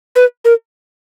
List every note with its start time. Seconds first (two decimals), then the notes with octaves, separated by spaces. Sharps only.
0.16 B4
0.45 A#4